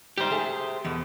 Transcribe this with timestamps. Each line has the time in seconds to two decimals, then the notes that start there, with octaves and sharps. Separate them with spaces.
0.18 G#2 G3 G4 C5
0.31 A3 G#4
0.85 E2 B2